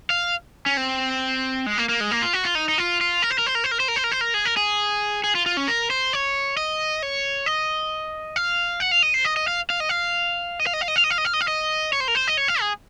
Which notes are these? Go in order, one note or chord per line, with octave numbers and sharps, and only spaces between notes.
F5
C#4
C4
G#3
A#3
A#3
G#3
A#3
F4
F#4
F4
D#4
D#4
F4
F4
A#4
C5
A#4
C5
A#4
C5
A#4
C5
A#4
C5
A#4
C5
A#4
G#4
A#4
G#4
G#4
F4
F4
C#4
A#4
C5
C#5
D#5
C#5
D#5
F5
F#5
F5
D#5
C5
D#5
D#5
F5
F5
D#5
F5
D#5
F5
D#5
F5
D#5
F5
D#5
F5
D#5
F5
D#5
F5
D#5
C#5
C5
A#4
C5
D#5
C#5
F5
G#4